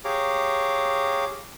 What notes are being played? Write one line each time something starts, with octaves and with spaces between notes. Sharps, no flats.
G4 G#4 C#5 F5 A#5 D6